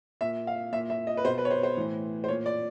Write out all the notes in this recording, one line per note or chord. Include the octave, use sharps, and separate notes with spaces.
A#2 E5
F5
A#2 E5
E5
D#5
B4
B2 C5
B4
C#5
C5
C5
A2 E3
C5
A#2 C#5
D5